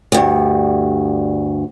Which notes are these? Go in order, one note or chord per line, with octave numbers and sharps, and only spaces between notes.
D2 G2